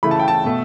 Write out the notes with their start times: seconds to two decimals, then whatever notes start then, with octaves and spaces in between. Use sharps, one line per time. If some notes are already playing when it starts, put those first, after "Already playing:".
0.03 C#3 E3 A3 B5
0.11 A5
0.19 G5
0.28 A5
0.44 B2 A3